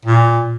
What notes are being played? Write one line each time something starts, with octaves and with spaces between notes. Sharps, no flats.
A#2